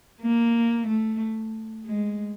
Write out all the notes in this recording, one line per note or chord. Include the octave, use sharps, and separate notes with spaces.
A#3
A3
G#3